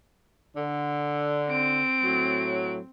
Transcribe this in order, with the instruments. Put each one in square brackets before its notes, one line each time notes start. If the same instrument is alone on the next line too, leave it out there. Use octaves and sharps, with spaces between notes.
[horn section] D3
[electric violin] C4 D7
[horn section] A2 F#3